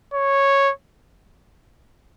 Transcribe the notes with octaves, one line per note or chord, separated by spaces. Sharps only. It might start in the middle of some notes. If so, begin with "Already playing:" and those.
C#5